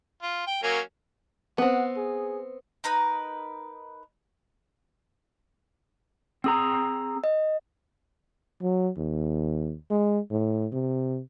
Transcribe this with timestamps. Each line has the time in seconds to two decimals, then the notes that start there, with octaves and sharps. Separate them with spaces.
0.22 F4
0.47 G5
0.63 F#3 A#3 C#4
1.58 B3 C4 F#5
1.97 G#4
2.84 D#4 A#4 B4 D#6
6.44 C4 G#4 A#5 E6
7.24 D#5
8.62 F#3
8.97 D#2
9.90 G#3
10.30 A2
10.72 C3